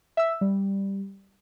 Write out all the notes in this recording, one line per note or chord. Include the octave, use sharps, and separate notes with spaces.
E5 E6
G3